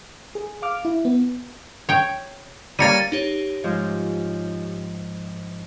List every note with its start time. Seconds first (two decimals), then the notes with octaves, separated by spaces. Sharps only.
0.35 G#4
0.62 F5 D6 F6
0.85 E4
1.05 B3
1.89 C#5 G5
2.79 G3 A#3 C#5 A6 C#7 D#7
3.12 D#4 G4 C#5
3.64 G#2 F3